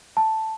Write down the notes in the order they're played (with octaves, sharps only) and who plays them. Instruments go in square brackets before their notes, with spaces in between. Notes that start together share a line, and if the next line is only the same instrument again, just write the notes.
[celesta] A5